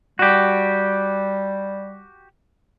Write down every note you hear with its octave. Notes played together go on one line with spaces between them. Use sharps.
G3 F#4 G4